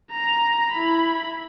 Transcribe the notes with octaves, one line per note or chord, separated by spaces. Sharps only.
A#5
E4 B5